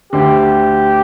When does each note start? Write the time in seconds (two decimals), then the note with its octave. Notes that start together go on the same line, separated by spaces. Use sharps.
0.13 D2 D3 G4